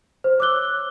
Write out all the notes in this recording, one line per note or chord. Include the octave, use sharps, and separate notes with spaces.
C5
C#5 D6 E6 F#6 G7